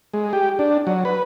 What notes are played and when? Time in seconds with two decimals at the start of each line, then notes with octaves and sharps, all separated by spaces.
0.14 G#3
0.33 G4
0.59 D4
0.87 F#3
1.05 B4